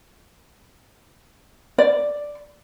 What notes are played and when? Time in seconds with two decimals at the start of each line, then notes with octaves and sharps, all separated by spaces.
1.78 D5